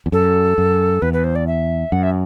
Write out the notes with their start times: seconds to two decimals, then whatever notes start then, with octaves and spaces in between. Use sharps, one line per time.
0.06 E2
0.12 F#2 A4
0.58 F#2
1.02 E2 B4
1.13 B4
1.24 C5
1.36 D5
1.47 E5
1.92 F#2 F#5
2.03 E5